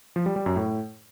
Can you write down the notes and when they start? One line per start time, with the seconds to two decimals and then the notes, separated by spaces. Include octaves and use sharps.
0.16 F3
0.26 G3
0.36 G3
0.46 F#2
0.56 A2